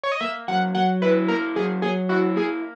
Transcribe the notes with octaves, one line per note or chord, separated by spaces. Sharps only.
C#5
D#5
A#3 E5
F#3 F#5
F#3 F#5
E4 B4
A#3 A#4
F#3 G#4
F#3 G#4
E4 F#4
A#3 G#4